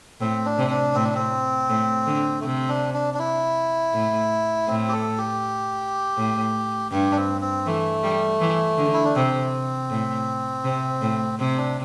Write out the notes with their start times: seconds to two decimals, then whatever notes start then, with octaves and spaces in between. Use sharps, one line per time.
0.20 A2 C4
0.45 D4
0.58 C3
0.70 D4
0.95 A2 C4
1.04 D4
1.15 C4
1.70 A2
2.07 D3
2.41 A3
2.44 C3 C4
2.69 D4
2.94 D4
3.14 D4
3.19 E4
3.93 A2
4.68 A2 C4
4.88 G4
4.93 A4
5.18 G4
6.17 A2
6.92 G2 G4
7.12 D4
7.17 C4
7.41 C4
7.66 E3 A3
8.03 G3
8.41 E3
8.78 D3
8.93 E4
9.05 D4
9.15 C3 C4
9.90 A2
10.65 C3
11.02 A2
11.39 C3 C4
11.58 D4